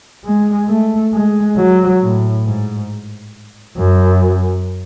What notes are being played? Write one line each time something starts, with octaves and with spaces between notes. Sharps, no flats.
G#3
A3
G#3
F#3
A2
G#2
F#2